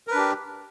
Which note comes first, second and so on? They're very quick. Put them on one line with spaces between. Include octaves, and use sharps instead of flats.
A#4 B4 D4 G4